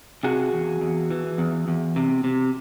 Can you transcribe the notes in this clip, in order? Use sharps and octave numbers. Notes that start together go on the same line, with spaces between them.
C3 F#4 G#4
E2
E2
E3
E2
E2
C3
C3